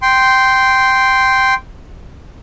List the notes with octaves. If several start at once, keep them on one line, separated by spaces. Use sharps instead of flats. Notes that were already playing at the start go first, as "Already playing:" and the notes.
G5 C6